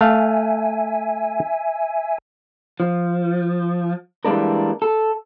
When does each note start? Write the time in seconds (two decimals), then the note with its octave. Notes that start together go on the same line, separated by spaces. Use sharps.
0.01 A3 E5 F5 G#5
2.80 F3
4.25 E3 G3 G#3 A#3 D4 A#4
4.82 A4